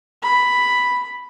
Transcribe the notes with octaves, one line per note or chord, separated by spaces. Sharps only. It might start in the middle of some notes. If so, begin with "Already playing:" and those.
B5